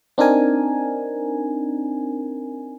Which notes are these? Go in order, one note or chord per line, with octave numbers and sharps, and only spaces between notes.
C4 D4 D#4 A#4 G#5